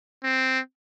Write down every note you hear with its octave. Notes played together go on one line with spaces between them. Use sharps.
C4